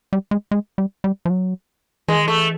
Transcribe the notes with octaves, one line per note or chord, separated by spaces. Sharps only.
G3
G#3
G#3
G3
G3
F3
F#3
E3 G#3
D#3
E3 A3